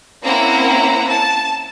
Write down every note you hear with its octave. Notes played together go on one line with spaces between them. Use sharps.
A#3 C4 C#4 E4 F#5 A#5
A5